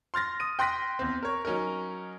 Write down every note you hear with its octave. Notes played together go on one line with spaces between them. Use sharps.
C6 F6 A6 A#6
D#6 D#7
G5 C6 F#6 A#6 B6
E2 C4
A#4 C#5
F#3 C#4 D#4 A#4